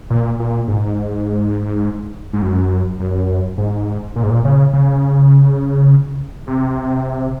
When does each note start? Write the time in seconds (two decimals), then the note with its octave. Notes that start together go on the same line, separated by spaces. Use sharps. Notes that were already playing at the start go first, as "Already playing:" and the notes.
0.10 A#2
0.40 A#2
0.68 G#2
2.33 G#2
2.42 F#2
3.00 F#2
3.58 G#2
4.16 A#2
4.23 G#2
4.30 A#2
4.45 C#3
4.73 C#3
6.47 C3